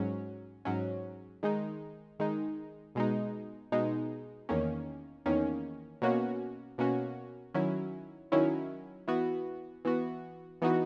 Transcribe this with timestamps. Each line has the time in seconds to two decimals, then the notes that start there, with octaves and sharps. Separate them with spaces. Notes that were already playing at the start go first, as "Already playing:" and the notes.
Already playing: G#2 F#3 C#4
0.65 G#2 F#3 C#4
1.43 D#3 G#3 D#4
2.19 D#3 G#3 D#4
2.95 B2 G#3 D#4
3.72 B2 G#3 D#4
4.49 E2 D#3 A#3 C#4
5.26 E2 D#3 A#3 C#4
6.02 B2 A#3 C#4 F#4
6.78 B2 A#3 C#4 F#4
7.54 D#3 F#3 C#4 E4
8.32 D#3 F#3 C#4 E4
9.08 E3 B3 F#4
9.85 E3 B3 F#4
10.62 E3 B3 D#4 F#4